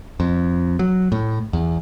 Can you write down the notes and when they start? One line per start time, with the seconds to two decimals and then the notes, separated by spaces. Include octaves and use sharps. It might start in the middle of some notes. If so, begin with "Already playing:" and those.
0.20 F2
0.79 F#3
1.12 A2
1.53 E2